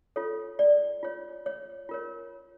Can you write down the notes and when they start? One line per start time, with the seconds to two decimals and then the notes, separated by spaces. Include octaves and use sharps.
0.16 F4 A4 C#5
0.59 D5
1.03 F4 C#5
1.46 C#5
1.89 F4 A#4 C#5